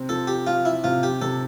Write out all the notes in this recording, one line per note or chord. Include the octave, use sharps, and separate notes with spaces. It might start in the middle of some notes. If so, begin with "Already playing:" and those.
Already playing: C3 C4
F3 A4
G4
F3 F4
E4
C3 F4
G4
C3 A4